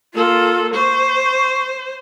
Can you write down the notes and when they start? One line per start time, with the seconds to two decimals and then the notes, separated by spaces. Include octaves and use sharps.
0.14 A#3 F4 A4
0.73 C5 C#6